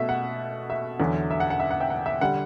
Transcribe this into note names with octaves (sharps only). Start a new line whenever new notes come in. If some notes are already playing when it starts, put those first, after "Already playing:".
Already playing: B2 A3 E5
F#5
E5
E2 D3 F#3
E5
F#5
F#5
E5
F#5
E5 G5
F#5
E5
D3 G3 F#5